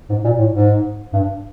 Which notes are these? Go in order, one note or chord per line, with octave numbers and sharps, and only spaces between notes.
G#2
A#2
A2
G#2
G2